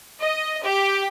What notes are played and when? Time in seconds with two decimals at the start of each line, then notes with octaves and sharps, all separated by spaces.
0.20 D#5
0.63 G4